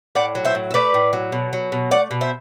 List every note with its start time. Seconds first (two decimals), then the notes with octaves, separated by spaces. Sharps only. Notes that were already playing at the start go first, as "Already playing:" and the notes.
0.15 A2 D5 F#5
0.35 F#3
0.45 C5 E5
0.55 A2
0.71 E5
0.74 A3 B4 D5
0.94 A2
1.13 F#3
1.32 B2
1.53 F#3
1.72 B2
1.91 A3 D5 F#5
2.11 B2
2.21 C5 E5